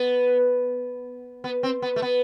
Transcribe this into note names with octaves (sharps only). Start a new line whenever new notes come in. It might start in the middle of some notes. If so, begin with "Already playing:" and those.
Already playing: B3
B3
C4
B3
A3
B3